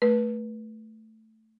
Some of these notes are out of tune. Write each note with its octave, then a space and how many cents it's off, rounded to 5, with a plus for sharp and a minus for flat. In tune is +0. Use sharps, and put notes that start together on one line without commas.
A3 +0 B4 -25